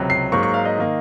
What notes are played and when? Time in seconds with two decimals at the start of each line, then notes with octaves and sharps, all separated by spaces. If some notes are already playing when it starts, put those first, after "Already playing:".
Already playing: C#2 C3 F#3
0.10 C7
0.32 G#2 F#3 A#3 C#6
0.43 C#6
0.54 F5
0.65 D#5
0.78 D#3 A#3